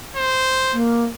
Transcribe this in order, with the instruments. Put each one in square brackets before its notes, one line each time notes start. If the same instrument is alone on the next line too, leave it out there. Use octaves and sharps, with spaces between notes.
[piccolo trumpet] C5
[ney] A#3